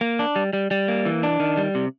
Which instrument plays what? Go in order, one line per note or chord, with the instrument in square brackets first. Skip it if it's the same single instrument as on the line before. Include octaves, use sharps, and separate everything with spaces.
[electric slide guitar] A#3
D4
G3
G3
G3
A#3
E3
D4
D#3
G3
C3